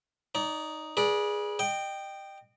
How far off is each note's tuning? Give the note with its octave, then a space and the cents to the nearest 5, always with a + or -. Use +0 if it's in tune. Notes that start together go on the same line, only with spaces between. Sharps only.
D#4 +0 D5 -30
G#4 +0 B4 -35 D5 +0
D#5 -30 G5 +0